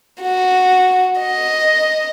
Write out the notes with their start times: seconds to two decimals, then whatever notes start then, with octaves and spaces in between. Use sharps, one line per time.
0.21 F#4
1.20 D#5